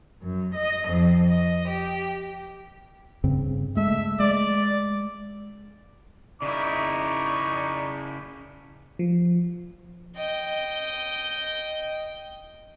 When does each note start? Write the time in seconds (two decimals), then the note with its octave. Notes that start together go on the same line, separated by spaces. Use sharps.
0.21 F#2
0.54 D#5
0.89 F2
1.31 D#5
1.69 G4
3.24 G2 C#3 C4
3.77 G#3 A3 E5
4.20 G#3 D5
6.42 C#3 D#4 E4 D5 C#6
8.99 F3
10.15 D#5 G5